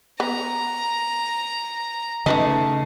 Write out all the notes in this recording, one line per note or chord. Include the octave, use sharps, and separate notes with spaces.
B3 A#5
C#3 A3 D#4 B4 D#5